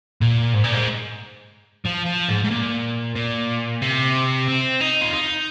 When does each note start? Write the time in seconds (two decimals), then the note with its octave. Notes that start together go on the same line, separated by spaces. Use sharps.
0.21 A#2
0.53 G#2
0.64 A#2
0.73 G#2
1.86 F3
2.06 F3
2.29 G#2
2.45 G#2
2.51 A#2
3.16 A#2
3.82 C3
4.48 C4
4.81 D#4
5.01 F4
5.13 D#4